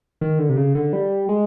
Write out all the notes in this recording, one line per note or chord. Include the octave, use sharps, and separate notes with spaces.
D#3
D3
C3
C#3
D3
G3
G#3